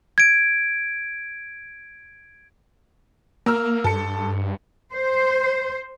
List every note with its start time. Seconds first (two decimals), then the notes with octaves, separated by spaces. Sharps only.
0.18 G#6 D7
3.46 A#3 A#4 E6 F6
3.84 G2 A4 C#7
4.93 C5